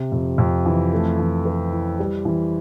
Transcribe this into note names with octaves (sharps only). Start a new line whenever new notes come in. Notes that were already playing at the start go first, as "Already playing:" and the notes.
Already playing: C3
F2
F2
E3
A3
E3
B4
E4
G3
E3